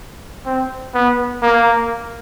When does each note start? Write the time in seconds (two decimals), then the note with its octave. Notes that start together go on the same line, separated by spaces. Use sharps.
0.46 C4
0.94 B3
1.43 A#3